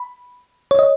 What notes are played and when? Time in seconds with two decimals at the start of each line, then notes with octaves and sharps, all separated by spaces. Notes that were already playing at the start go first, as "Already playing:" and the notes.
Already playing: B5
0.71 C#5
0.79 D#5